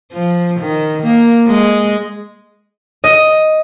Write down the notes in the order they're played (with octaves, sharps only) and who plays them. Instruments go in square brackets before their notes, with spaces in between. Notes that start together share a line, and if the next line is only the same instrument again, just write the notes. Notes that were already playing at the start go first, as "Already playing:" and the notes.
[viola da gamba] F3
D#3
A#3
G#3
[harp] D#5